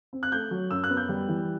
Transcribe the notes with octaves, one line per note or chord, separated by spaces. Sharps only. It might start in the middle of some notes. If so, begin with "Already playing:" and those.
C4
F#6
A3 G6
F#3
F#2 E6
F#6
B3
G6
G3
E3